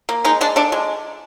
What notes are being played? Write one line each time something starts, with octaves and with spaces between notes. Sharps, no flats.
A#3
G#3 D#4
G#3 D4
D3 D4
G#3